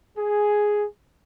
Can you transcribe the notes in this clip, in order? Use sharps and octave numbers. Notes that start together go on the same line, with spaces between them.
G#4